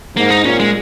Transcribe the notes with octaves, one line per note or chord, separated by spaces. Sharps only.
G#2 A#3
D#4
A#2 C#4
G#3